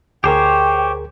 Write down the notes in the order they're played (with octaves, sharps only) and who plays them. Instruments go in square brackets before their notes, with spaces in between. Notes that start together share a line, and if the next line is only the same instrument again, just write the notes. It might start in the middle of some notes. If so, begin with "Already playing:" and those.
[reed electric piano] D2 G#4 A#4 [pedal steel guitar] G4 C5 C#5 [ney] G5